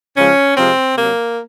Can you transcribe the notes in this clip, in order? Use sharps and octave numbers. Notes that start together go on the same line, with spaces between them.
C#3 F3 G#3 C#4
C3 F3 G#3 C4
C3 F#3 A#3